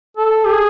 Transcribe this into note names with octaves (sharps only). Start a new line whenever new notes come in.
A4
G4
G#4